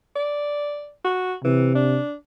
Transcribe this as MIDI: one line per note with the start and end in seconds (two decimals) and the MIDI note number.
0.16 0.91 74
1.04 1.34 66
1.44 1.99 48
1.44 1.73 52
1.75 2.13 62